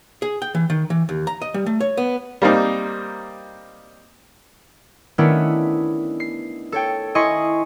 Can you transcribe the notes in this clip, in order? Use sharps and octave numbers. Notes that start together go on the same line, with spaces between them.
G#4
G5
E3
D#3
E3
D#2
A#5
D#5
G3
A3
C#5
B3
G3 A#3 C4 D#4
D#3 A3 B3 C#4 D4 E4
C7
A4 C#5 G5
E4 D#5 G#5 C6 C#6